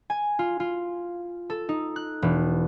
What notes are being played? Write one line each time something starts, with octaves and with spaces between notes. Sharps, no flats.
G#5
F4
F4
A4
D#4
F#6
E1